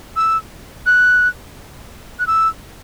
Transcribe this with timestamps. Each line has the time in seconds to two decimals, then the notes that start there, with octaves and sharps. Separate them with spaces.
0.16 E6
0.86 F#6
2.19 F#6
2.27 E6